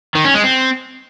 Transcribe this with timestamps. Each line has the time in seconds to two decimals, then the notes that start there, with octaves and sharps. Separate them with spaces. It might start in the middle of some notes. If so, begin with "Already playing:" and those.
0.15 D#3
0.25 C#4
0.34 G#3
0.44 C4